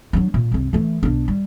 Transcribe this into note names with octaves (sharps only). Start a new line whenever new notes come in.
F#3 D4
A#2
C2 F#2
E3 A3
B1 D4
G3